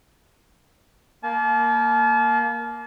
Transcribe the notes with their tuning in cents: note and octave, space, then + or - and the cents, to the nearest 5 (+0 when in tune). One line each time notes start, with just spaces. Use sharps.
A#3 +0 A5 -40